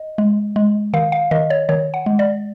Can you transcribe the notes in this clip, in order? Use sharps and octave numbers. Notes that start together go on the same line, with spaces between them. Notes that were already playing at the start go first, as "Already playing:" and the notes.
Already playing: D#5
G#3
G#3
D#3 F5
F5
D#3 D#5
C#5
D#3 C#5
F#5
G#3
D5